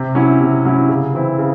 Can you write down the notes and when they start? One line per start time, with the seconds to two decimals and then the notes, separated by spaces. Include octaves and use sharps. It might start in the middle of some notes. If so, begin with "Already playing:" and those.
Already playing: C3
0.15 F#3 C#4 E4
0.40 C3
0.65 F#3 C#4 E4
0.89 C#3
1.14 E3 C4 E4
1.38 C#3